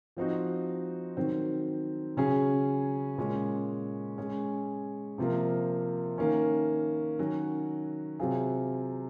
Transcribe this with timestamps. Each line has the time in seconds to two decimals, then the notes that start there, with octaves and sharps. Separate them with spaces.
0.17 F3 C4 D#4 F#4
1.17 D#3 F#3 C4
2.17 C#3 F#3 C#4 G#4
3.17 A#2 G#3 C#4
4.18 G#3 C#4 G#4
5.18 C3 F3 A#3
6.18 D#3 A#3 C#4
7.19 D#3 F#3 C#4 F#4
8.19 C3 F#3 C4 F4 G#4